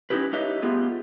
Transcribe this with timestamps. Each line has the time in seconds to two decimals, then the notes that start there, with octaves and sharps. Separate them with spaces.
0.10 C#4 D#4 E4 G4 B4
0.33 D#4 G4 B4 C#5 D#5 E5
0.62 A3 B3 F4 G4 G#4